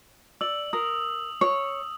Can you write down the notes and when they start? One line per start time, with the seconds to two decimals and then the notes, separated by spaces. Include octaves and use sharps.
0.41 D5 E6 F#7
0.73 A#4 D#6
1.41 C#5